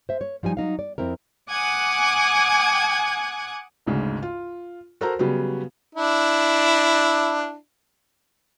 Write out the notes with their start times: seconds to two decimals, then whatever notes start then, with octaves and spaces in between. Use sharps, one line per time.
0.09 C5 E5
0.21 C#5
0.43 F3 G3 D#4 G#5
0.57 F#3 D#4 F5
0.79 D5
0.98 F2 C4 E4 A#4
1.49 F#5 G#5 D6 D#6 F#6 G#6
3.86 G#1 D2 G#2 C#3
4.22 F4
5.01 F#4 A4 A#4 C5 A#5
5.19 C#3 F#3 G3 B3
5.95 D4 E4